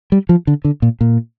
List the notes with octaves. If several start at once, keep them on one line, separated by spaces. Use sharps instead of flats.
G3
F3
D3
D3
A#2
A#2